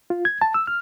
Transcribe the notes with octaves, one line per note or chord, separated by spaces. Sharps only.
F4
G#6
A5
E6
F6